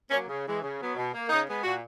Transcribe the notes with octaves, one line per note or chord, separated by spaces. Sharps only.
F#3 A#3 C#4
C#3
E3 G#3
C#3
F#3 B3
B2
A#3
C#3 D#4
G#3 B3
A#2 F#4